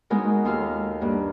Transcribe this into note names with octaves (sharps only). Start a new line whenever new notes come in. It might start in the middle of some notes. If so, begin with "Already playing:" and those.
G#3 B3 D#4 F#4 A#4
D#2 F4 A4 F6
G2 A#3